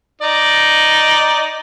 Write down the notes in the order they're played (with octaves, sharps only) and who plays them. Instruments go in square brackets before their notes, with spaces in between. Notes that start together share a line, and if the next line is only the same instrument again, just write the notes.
[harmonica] D#4 D5